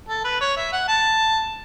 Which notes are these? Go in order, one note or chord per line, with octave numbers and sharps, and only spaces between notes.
A4
B4
C#5
E5
F#5
A5